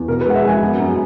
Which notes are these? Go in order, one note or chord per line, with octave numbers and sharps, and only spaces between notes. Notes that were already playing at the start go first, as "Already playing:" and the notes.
Already playing: E2
B2 A#4
B4
G#3 F#5
E5
G#3 G#5
F#2
F#2